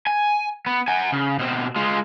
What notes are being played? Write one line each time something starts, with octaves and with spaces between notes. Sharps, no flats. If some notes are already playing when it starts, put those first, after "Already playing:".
G#5
B3
F#5 G#5
C#3
B2 C4
G#3 F4